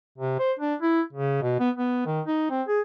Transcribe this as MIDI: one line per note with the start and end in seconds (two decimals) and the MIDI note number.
0.18 0.37 48
0.39 0.52 72
0.59 0.75 62
0.82 1.01 64
1.13 1.41 49
1.42 1.59 47
1.60 1.70 59
1.76 2.01 59
2.06 2.21 51
2.26 2.47 63
2.50 2.63 60
2.68 2.81 68